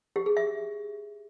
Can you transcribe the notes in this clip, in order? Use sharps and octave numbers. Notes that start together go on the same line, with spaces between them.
G4
G#4
E5